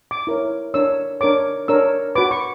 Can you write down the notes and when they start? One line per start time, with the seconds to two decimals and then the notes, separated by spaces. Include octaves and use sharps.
0.11 D6
0.27 E4 A#4 C#5
0.74 D4 A#4 C#5 E6
1.21 D4 A#4 C#5 D6
1.68 D4 A#4 C#5 E6
2.16 F#4 B4 D6
2.31 C#6